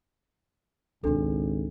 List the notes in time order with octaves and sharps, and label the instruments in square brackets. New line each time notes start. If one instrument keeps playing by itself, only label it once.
[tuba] G#1 [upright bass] C#2 B2 [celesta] D4 A4